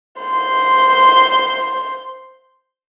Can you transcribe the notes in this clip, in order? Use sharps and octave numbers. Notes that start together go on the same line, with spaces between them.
C5 C6